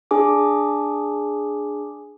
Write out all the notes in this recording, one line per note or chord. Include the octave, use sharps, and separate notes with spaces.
D4 G#4 G#5 D6